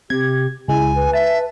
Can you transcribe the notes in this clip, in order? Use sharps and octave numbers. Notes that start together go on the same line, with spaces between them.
C3 G4 G#6
C#2 G#3 E4 G#5
B4
E5 A5